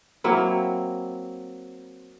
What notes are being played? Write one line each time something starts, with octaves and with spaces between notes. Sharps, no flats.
F#3 A#3 C4 E4